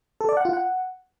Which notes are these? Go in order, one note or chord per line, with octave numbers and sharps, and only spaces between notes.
A4
D5
F#5
F4
F#5